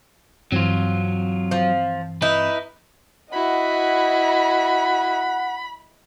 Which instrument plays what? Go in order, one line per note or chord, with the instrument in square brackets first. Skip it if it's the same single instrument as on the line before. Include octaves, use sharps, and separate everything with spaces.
[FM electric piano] G2 E3 C4 [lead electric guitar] F#3 F4
[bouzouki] F3
[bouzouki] D#4 [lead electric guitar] E4 B4
[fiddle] E4 F#4 [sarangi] D#5 [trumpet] F#5 [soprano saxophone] B5